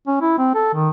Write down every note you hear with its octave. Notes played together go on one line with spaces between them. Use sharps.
C#4
E4
C4
A4
D#3